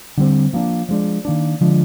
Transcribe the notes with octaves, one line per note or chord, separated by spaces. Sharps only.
D3 G3 C4
F3 A#3 D4
F3 G#3 D4
D#3 A#3 D4
D3 F3 G#3 D4